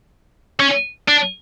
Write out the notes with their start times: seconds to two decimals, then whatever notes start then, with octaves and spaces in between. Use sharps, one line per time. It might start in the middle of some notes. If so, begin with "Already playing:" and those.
0.60 C#4
1.08 D4